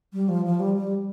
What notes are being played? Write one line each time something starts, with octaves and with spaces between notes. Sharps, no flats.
G3
F3
F3
G3
G3